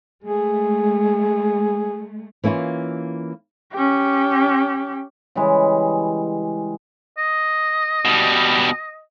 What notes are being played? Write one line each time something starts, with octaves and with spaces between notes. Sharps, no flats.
G#3 A3 G#4
E3 A#3 C#4 E4 F4
C#4 G4
C#3 E3 G3 G#3
D#5
B2 G3